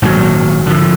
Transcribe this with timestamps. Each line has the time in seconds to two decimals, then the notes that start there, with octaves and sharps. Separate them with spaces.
0.02 G#1 A#2 D3 F#3
0.66 D3 F3